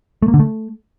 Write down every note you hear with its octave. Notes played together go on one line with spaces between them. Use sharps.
A3
A#3
D3
A3